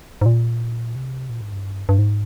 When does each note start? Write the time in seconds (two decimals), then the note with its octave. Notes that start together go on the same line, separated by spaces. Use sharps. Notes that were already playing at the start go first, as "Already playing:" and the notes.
0.21 G#2
0.26 A#2
0.96 C3
1.30 A#2
1.41 G#2
1.52 G2
1.89 G2
1.99 G#2